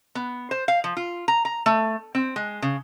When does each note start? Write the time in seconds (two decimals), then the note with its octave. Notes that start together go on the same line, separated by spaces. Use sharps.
0.15 B3
0.51 C5
0.68 F5
0.84 F3
0.97 F4
1.28 A#5
1.45 A#5
1.66 A3
2.15 C4
2.36 G#3
2.62 C#3